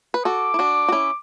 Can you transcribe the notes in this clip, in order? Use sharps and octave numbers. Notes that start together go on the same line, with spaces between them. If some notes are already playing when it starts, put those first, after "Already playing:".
B4
F#4 A4 D6
E4
D4 F#4
F#4
C#4 E4